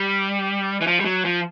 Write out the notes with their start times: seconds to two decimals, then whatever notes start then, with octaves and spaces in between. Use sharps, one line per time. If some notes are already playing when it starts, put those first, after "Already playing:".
Already playing: G3
0.81 E3
0.87 F3
1.01 G3
1.05 F#3
1.25 F3